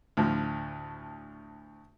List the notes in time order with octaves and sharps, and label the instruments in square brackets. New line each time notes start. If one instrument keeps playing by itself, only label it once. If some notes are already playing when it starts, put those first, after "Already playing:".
[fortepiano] D2 A2 F3